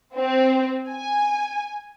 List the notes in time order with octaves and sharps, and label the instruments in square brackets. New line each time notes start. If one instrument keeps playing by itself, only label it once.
[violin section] C4
G#5